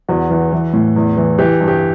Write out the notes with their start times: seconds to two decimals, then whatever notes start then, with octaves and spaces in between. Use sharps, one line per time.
0.09 E2 F#4
0.30 E3
0.52 E3
0.73 A2
0.96 E2
1.17 E3
1.39 E3 G4
1.60 G2
1.68 G4